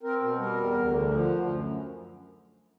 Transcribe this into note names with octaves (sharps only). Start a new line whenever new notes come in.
C4 A#4
B2
G3 A#4
E2
D2
D3
F3
D2
F#2